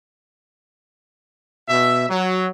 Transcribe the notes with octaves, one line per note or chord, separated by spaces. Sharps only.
B2 E5
F#3